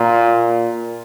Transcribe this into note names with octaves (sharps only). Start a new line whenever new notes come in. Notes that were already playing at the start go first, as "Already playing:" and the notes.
Already playing: A#2